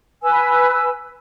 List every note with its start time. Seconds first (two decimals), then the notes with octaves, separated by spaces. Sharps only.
0.23 B4 G#5 E6